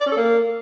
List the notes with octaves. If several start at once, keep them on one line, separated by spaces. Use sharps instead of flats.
D5
C#4
A4
A#3